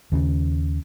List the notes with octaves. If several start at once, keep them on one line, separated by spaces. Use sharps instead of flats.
D#2 C#3